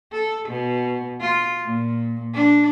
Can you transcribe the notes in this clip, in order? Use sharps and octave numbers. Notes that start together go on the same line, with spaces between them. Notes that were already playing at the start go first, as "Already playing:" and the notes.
A4
B2
F4
A#2
D4